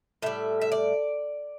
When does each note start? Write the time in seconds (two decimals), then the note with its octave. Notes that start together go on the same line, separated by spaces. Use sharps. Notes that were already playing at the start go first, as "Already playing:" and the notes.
0.22 A2 G3 E5
0.61 E5
0.72 D5